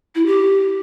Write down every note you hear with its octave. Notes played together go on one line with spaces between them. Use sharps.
E4
G4